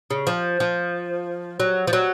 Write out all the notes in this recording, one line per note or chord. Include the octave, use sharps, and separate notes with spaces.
C#3
F3
F3
F#3
F3
F#3